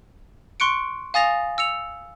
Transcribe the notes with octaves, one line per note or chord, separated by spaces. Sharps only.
C6 C#6 F#6 C#7 D7
F5 G#5 D#6 A6 A#6 F7
E6 C#7 F7